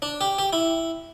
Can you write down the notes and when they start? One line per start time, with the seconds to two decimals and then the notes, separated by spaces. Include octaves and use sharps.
0.02 D4
0.21 G4
0.39 G4
0.53 E4